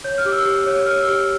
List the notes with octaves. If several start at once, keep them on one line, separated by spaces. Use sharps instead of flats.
C#5 G6
F6
G4 D6
E6
G4
C#5
C#5 F6
E6
G4 F6